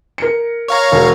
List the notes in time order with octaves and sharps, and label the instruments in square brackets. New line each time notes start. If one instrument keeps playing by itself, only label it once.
[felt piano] A#4 C#7
[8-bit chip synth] C#5 F5 A#5
[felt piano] E1